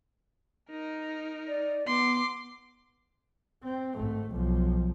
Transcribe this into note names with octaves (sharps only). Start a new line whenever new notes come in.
D#4 A#4
D5
B3 C6 D6
C4
G#1 A3
B1 F3